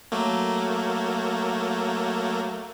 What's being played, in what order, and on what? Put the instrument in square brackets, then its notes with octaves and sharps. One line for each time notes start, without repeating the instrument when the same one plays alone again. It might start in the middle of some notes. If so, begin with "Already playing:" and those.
[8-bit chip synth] F#3 A3 A#3